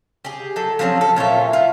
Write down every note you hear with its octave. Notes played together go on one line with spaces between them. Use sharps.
G4 G#4
F#3 A4
F3 F#3 C4 C#4
A4
A#2 F4 C#5 E5
F4